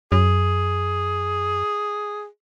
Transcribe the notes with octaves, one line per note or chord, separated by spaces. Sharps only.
F#2 G#4